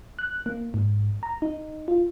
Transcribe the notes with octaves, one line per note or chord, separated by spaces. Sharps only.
F#6
A#3
G#2
A#5
D#4
F4